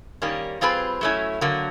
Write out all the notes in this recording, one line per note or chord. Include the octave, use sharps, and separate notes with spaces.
D#3 G3 A#3 C#4
G3 C4 F4 G#4 B4
F#3 A3 C#4 E4
D3 F#3 A#3